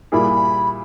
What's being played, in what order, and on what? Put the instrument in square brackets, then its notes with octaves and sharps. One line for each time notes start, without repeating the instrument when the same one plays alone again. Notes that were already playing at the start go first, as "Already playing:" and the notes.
[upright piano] A#2 G3 A#3 E4 G#4 [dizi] B5